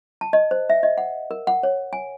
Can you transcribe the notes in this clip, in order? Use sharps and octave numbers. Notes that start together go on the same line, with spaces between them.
A5
D#5
C5
E5
D#5
F#5
A#4
F#5
C#5
G#5